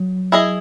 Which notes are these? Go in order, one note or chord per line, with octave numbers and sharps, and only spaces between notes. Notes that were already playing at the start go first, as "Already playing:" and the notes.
Already playing: F#3
E4 G#4 D#5